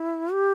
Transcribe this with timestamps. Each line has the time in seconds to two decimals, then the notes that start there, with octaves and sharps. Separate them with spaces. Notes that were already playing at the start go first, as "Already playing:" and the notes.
Already playing: E4
0.33 G4